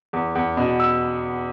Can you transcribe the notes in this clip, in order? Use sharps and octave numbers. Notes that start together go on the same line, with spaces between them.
E2
E2
B2
E6